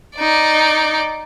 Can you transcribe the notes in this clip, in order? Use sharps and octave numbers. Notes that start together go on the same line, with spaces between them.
D#4 D5